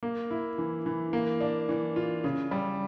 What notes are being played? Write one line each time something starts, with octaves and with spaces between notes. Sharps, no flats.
A#3
E4
E3
E3
A#3
D4
E3
F4
C#3
G3